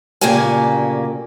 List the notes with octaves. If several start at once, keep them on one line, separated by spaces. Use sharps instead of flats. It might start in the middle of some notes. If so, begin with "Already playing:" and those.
D2 A#2 C#3 A#3 G4 G#5